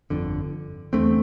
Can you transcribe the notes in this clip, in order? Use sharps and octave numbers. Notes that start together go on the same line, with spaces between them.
G1 F2 D3
E2 D3 A3 C4